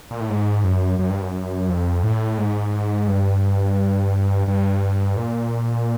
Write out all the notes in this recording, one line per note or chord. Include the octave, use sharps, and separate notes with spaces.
A#2
A2
G#2
F#2
F#2
G2
F#2
F2
A2
G#2
G2
G2
A#2